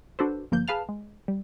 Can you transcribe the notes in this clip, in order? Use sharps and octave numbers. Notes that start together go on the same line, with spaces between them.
D4 F#4 A4 B4 C5
G1 F3 A#3 G6
G#4 B4 F5 A5 F6
G#3
G3